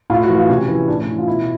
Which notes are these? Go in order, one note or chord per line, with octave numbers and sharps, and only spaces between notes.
A2 F4
F#4
E3
F4
C3 C#4
E3
A2 D4
C#4
E3
F4
B2 E4